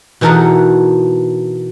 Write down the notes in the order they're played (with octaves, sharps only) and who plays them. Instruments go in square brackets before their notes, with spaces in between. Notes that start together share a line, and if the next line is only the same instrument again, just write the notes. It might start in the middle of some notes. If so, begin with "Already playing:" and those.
[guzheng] B2 E3 D#4 A4 A#4 F#5